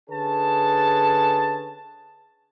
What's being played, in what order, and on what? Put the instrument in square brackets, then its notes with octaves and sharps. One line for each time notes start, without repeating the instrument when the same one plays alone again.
[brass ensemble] D3 C#4 G#4 B4 A5